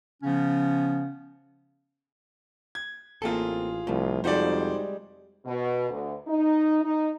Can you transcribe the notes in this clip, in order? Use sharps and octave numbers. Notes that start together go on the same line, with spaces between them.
C#3 F3 B3 C#4
G#6
A1 A#3 C4 F4 G#4 A4
C2 A2 F3
C2 F2 G3 G#3 D#4 F#4 C5 D5
B2
D2
D#4
D#4